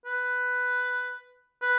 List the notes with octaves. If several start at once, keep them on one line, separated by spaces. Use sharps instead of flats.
B4
B4